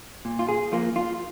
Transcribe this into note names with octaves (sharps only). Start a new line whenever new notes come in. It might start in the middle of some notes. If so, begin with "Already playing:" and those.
A#2
F4
G#4
F3 A#3 F4
F4